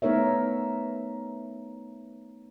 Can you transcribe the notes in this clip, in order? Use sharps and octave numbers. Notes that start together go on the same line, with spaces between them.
A3 B3 D#4 A#4 C#5 E5